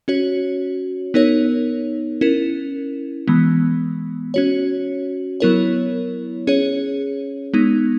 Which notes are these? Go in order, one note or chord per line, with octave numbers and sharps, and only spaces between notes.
C#4 F#4 C#5
B3 D#4 A#4 C#5
C#4 E4 A#4
E3 G#3 B3
C#4 F#4 C#5
F#3 B3 E4 A#4 C#5
C#4 G#4 C#5
G#3 B3 D#4